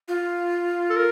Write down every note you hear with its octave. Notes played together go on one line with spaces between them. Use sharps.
F4
A4
A#4